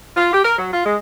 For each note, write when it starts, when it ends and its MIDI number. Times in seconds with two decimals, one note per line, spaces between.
0.16 0.33 65
0.33 0.41 67
0.45 0.57 70
0.58 0.70 54
0.73 0.82 65
0.86 0.97 56